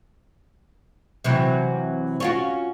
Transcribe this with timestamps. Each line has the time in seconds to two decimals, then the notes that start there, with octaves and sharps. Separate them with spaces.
1.24 C3 E3 F#3
2.20 C#4 F4 F#4